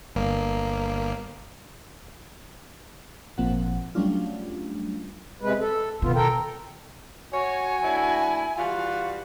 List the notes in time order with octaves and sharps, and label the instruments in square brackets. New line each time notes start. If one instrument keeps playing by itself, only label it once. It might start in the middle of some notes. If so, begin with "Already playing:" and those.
[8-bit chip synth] G1 A#3
[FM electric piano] G#1 A#2 F3 A#3 C4 F#5
F#3 G3 A3 C#4 D4 F4
[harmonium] C3 G#3 B4
A4
[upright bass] B2 D#3 [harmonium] B3 F4
[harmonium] A4 A#4 G5
[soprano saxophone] F#4 [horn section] C#5 [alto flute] G#5
[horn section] A3 D4 E4
[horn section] E3 G3 F#4 [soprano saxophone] F4